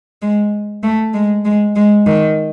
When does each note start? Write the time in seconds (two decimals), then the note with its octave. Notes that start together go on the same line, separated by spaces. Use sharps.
0.22 G#3
0.83 A3
1.14 G#3
1.45 G#3
1.76 G#3
2.07 D#3